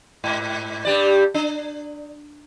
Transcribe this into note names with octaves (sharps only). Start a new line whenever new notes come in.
G#2
G2 G3 D5
D4